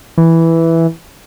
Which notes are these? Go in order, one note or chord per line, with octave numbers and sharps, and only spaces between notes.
E3